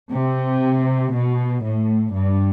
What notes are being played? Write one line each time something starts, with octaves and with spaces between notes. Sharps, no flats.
C3
B2
A2
G2